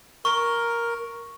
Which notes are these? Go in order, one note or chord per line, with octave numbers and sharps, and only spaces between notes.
A#4 C#6